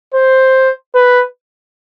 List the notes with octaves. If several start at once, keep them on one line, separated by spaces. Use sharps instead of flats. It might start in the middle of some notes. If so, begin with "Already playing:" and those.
C5
B4